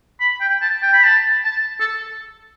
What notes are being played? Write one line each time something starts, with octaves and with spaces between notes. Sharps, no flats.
B5
G5
A5
G5
B5
A5
A5
A4